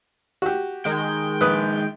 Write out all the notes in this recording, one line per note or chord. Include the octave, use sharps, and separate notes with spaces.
F#4 G4
D#3 G#3 G5
A#1 B4 D#6